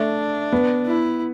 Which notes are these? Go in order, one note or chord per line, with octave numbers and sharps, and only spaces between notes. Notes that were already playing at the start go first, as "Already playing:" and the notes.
Already playing: A3 D4
B3
E4